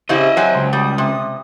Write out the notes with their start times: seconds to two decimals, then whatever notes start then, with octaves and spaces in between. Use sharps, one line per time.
0.09 C#3 C4 E4 G4 D#5 E5
0.37 F#3 C4 G#5
0.55 C#2 C6
0.73 G3 D#6
0.98 C3